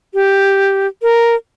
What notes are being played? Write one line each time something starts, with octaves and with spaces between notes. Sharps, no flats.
G4
A#4